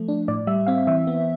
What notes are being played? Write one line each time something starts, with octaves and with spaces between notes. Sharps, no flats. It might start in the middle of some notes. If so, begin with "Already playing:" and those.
Already playing: F3 A3
D4
A2 D5
G3 E5
C4 F5
E3 E5
B3